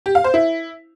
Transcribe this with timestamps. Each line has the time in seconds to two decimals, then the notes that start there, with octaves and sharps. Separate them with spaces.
0.06 G4
0.15 F5
0.24 C5
0.34 E4